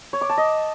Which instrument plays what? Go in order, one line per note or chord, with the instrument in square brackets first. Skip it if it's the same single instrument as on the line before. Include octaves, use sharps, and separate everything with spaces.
[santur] C#5
D6
A5
D#5